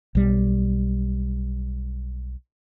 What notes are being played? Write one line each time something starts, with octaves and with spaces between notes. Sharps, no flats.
B1 G3